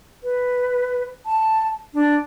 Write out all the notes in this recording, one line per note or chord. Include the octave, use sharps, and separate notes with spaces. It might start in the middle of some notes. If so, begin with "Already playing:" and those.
B4
A5
D4